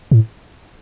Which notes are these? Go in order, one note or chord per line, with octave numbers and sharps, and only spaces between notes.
A2